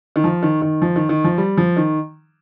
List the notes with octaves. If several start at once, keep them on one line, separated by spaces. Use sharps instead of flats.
D#3
F3
D#3
D#3
F3
D#3
D#3
F3
G3
F3
D#3